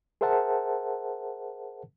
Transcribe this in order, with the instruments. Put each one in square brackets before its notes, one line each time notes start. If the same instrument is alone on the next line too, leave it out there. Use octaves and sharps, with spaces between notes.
[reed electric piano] G#4 A#4 C5 E5 F#5 A5